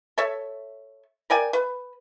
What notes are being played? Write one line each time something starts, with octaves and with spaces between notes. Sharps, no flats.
A4 C#5 E5
A#4 D5 G5 G#5
B4